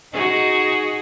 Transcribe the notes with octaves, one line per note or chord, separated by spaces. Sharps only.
D#4 F#4 G#4